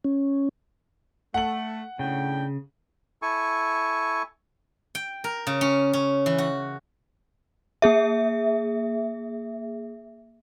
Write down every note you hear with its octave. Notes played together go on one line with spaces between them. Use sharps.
C#4
A3 F#5 F#7
A2 C#3 D4 G5
E4 A4 G#5 C#6
G5
A#4
C#3
C#4
C#4
E3
F#4
A#3 G#4 E5